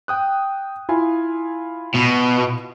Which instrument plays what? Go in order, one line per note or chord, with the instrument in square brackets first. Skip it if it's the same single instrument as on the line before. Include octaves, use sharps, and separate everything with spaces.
[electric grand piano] G5 D#6 F#6
E4 F4 G#5
[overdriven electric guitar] B2